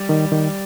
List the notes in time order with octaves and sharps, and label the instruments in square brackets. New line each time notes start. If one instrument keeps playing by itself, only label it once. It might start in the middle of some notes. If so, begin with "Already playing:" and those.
Already playing: [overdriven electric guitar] G3
[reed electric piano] D#3
D#3